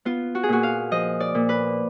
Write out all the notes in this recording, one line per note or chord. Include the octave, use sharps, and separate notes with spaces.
B3 F4
F#4
G#4
A#2 F#4
F5
F3 D#5
D5
A#2
B4